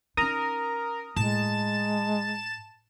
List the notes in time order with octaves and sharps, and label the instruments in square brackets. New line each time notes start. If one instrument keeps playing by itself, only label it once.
[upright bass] C#4 D#4 [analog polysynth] A#4 [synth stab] A#5 D#6
[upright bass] A2 [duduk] G#3 [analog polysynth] A5 E7